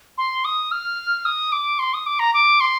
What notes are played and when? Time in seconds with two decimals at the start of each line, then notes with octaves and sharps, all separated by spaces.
0.18 C6
0.45 D#6
0.71 F6
1.25 D#6
1.52 D6
1.79 C6
1.94 D#6
2.06 D6
2.19 A#5
2.34 D6
2.60 C6